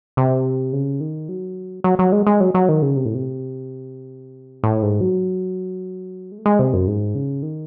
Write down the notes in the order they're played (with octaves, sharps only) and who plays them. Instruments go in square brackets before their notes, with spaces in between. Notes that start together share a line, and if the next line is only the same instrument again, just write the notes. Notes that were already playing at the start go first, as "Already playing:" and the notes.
[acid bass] C3
C#3
D#3
F#3
F#3
F#3
G#3
G#3
F#3
F#3
D#3
C#3
C3
A2
C3
A2
G#2
F#3
G#3
A3
G#3
C3
F#2
G#2
C#3
D#3